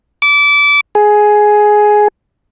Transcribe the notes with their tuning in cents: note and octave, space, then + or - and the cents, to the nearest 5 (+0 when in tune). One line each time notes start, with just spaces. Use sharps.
D6 -25
G#4 +10